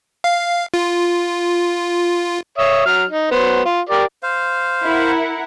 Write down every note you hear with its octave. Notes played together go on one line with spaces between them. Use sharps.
F5
F4
C#5 E5 D#6
F#3 F6
D#4
F#3 B3 C5
F4
G4 A#4 D5
C5 F5
E4 A#4 F#5